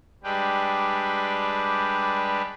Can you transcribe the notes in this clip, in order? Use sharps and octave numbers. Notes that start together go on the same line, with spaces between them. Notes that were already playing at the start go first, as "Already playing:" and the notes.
G3 G#3 D4 G4 B4